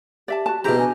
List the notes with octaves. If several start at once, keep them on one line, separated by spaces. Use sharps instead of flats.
G4 D5 E5 A5
F#4 A5
B2 E4 G4 G#4 C5 A#5
D4 G#5